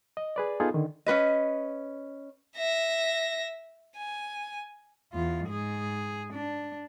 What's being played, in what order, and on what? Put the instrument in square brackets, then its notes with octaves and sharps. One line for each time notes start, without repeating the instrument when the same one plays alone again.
[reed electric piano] D#5
G#4 B4 D5
B3 D#4 F4 G#4 A4
D3 D#3
[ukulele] C#4 D4 B4 D#5
[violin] E5 A#6
G#5
[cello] E2 F4
G#2 G#4
D4